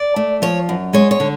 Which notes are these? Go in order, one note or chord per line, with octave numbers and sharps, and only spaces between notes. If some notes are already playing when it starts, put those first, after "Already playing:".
Already playing: D5
A3
F3 C#5
F#2
G#3 C#5
C#5
D3